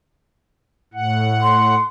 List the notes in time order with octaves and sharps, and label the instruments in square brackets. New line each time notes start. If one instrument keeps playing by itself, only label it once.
[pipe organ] A2 F#5
[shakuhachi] C6